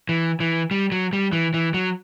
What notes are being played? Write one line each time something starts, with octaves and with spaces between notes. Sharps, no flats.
E3
E3
G3
F#3
G3
E3
E3
F#3